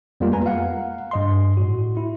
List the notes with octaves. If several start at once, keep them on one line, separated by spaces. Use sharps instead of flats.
F2 G3 G#3 A#3 B3 F4
B4 G#5 A#5
F5 F#5
G2 D#5 C6
A2 F#4
E4